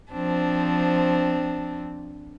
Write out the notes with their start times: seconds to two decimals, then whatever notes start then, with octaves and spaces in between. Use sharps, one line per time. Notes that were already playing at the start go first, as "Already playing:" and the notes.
0.12 F3 C4 D4